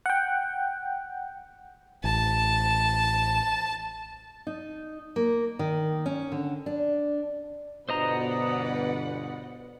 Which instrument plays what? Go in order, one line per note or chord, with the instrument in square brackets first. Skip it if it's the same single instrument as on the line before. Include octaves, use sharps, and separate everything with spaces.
[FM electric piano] F#5 G5
[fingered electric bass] A1 [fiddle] A5
[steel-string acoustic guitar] D#4
A#3
D#3
C#4
D3
D4
[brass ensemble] G1 B2 [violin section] B4 D5 F#5 [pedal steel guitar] C5 D#5 A#5